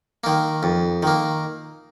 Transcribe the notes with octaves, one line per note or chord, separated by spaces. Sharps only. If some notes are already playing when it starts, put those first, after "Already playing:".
D#3 A#3
F2
D#3 A#3